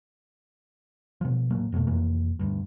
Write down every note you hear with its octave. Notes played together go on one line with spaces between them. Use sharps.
B2 F3
D#1 A1 F#3 A#3
F2 B2 G#3 A3
F1 F2 E3 A#3
D2 G2